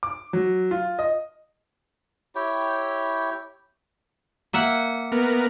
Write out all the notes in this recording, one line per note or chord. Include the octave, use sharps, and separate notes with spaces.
D6
F#3
F4
D#5
E4 G4 C#5 G5
A#3 E5 F#5
B3 A#4